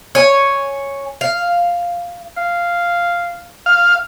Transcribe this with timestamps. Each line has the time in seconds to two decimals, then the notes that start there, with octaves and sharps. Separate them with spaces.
0.15 C#5 G#5
1.21 F5
2.37 F5
3.66 F5